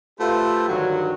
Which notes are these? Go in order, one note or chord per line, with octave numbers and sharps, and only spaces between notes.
A3 F4 G4 B4 C5 E5
G2 D3 D#3 F#3